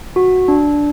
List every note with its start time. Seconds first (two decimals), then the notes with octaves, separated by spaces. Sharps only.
0.16 F#4
0.48 D4